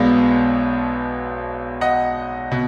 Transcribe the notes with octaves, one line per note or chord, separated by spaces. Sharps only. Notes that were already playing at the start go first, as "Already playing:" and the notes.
Already playing: B1 B2 G#3 B3 D5 F5
D#5 F#5
B2